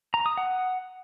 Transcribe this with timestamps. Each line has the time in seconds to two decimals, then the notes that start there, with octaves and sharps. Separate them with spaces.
0.14 A#5
0.26 D#6
0.37 F#5